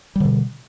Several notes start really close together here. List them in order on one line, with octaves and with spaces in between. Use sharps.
G3 D3 B2